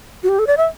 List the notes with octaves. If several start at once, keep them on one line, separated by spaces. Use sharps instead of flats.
F#4
G4
A4
D5
E5